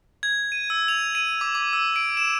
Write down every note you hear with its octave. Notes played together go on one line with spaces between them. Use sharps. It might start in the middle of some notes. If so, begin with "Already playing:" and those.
G#6
D#7
E6
F7
D#7
D6
D6
E6
D7
E7